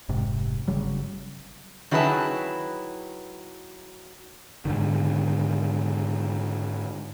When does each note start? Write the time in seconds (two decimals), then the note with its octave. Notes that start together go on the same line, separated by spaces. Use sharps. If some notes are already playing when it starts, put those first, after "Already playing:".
0.09 F1 G#2 C3
0.67 G1 C#3 F#3 G3
1.91 D#3 F#3 E4 G#4 B4 A5
4.65 G#2 D3 D#3